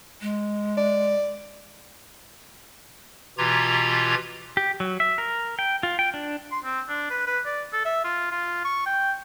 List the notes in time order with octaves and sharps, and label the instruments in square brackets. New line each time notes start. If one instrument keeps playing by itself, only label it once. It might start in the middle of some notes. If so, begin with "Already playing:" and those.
[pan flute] G#3
[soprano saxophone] D5
[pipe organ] B2 E3 F4 G4 A#5 G#6
[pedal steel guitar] G4
F#3
E5
A#4
G5
F4
G5
D4
[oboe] C6
C4
D4
B4
B4
D5
A4
E5
F4
F4
C#6
G5